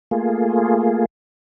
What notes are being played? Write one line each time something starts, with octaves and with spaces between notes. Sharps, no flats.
A3 A#3 F4 G#4